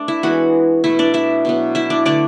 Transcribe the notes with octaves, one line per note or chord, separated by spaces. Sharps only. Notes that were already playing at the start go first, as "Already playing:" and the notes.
Already playing: A3 D4 D5
E4 E5
E3 G#3 B3 F#4 F#5
B2 A3 E4 E5
D4 D5
E4 E5
B2 F#3 B3
E4 E5
D4 D5
D3 A3 D4 D5